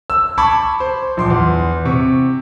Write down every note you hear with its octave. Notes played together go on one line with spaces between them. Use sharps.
E6
A5 B5 C#6 D6 G#6
C5
A#1 C6 D6
E2
C3 C#6